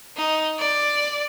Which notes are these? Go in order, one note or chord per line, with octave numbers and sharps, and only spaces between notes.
D#4
D5